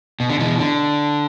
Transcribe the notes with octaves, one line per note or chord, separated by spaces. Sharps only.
B2
D3
B2 E3
D3